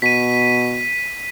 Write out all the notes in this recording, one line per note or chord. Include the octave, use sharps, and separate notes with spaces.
B2 B6 D#7